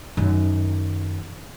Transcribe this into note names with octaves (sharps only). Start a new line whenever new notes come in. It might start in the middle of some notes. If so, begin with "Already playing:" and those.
F#2 D#3